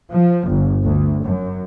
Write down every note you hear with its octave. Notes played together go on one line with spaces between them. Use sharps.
F3
G1
D2
F#2